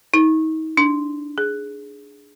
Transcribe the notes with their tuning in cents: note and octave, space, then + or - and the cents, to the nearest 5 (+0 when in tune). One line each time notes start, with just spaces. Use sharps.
D#4 +35
D4 -5
G#4 +5